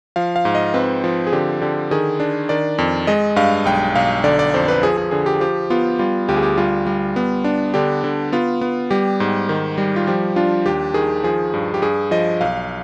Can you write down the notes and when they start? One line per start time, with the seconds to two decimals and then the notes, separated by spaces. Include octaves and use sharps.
0.16 F3 F5
0.36 F5
0.45 G#2
0.55 D#5
0.74 C4 B4
1.04 F3
1.27 G#4
1.33 D3 G4
1.61 D3 G4
1.91 D#3 G#4
2.20 D4
2.49 D#3 D5
2.78 F2
3.07 G#3 D#5
3.36 G2 F5
3.65 B1 G5
3.95 B1 F5
4.24 D3 D5
4.39 D5
4.54 F2 C5
4.68 B4
4.83 F3 G#4
4.97 G#4
5.11 D3 G#4
5.26 G4
5.40 F3 G4
5.70 B3 F4
5.99 G3 F4
6.28 D2 G4
6.36 G#4
6.43 G4
6.57 G3 F4
6.87 G3
7.16 B3
7.44 D4
7.74 D3 G4
8.04 D3
8.32 B3 F4
8.61 B3
8.91 G3 G4
9.20 G#2
9.49 D#3
9.78 G3
9.96 F4
10.07 F3 G4
10.36 D4 F4
10.66 D#2 G4
10.94 D#3 G#4
11.24 F3 G#4
11.54 G2
11.74 G4
11.82 G2 G#4
12.11 F3 D#5
12.41 B1 F5